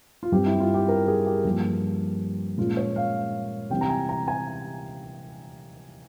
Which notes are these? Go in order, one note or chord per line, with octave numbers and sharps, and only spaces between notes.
F4
G2 G3 C4 G4
E4
F4
G4
A#4
G#4
G4
G2 F3 A#3
A#2 G#3 C#4 F4
C#5
F5
C3 E3 G3 C4 G5
A#5
G#5
A#5
G#5